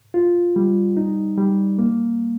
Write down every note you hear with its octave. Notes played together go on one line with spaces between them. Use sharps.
F4
G3
D#4
G3
A#3